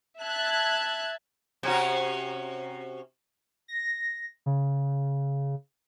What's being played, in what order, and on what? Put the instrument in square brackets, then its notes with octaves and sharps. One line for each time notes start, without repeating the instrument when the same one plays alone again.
[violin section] E5 A5 F#6 G#6
[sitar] C3 C#4 F#4
[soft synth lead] A#6
C#3